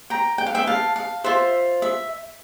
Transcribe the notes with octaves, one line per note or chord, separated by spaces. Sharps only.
G5 A#5
G5
F5
E5 G5
F5 A5
F5
F4 C5 E5
E5